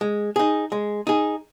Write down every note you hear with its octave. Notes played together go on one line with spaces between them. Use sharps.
G#3
D#4 G#4
G#3
D#4 G#4